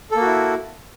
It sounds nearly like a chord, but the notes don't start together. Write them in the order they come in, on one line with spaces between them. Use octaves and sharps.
A4 A#3 F#4 E4